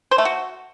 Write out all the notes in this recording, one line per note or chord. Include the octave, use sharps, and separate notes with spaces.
C5
A3
F#4